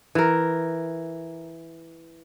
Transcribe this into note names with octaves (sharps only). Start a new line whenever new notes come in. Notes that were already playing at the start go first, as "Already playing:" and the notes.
E3 A#4